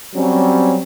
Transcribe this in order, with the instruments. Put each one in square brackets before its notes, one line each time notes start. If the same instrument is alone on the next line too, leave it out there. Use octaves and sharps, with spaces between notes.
[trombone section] F#3 G3 C4 C#4